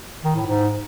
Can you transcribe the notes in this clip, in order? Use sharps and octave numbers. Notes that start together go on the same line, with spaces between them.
D#3
A2
G#2